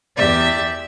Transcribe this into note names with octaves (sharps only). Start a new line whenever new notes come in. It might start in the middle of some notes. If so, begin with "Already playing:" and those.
E2 G4 D5 E5